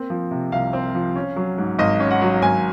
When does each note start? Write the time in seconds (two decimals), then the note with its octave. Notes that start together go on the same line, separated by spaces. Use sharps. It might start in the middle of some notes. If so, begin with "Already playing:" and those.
Already playing: A#3 C4
0.10 F3
0.31 C3
0.52 C2 F5
0.73 C4
0.95 F3
1.16 C#4
1.36 F#3
1.58 G#2
1.79 G#1 D#5
2.00 C#4
2.11 F#5
2.21 F#3
2.42 G#1 G#5